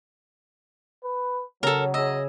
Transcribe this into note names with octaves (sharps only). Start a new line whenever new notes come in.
B4
C#3 F#3 A4 A#4
G#4 D#5 E5 E6